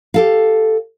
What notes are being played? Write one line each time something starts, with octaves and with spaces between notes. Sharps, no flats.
G4 A4 F5